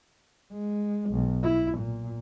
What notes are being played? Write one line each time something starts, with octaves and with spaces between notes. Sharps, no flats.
G#3
B1
E4
A#2